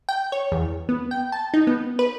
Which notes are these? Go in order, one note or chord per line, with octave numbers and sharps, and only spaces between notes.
G5
C#5
E2
B3
G5
A5
D#4
B3
B4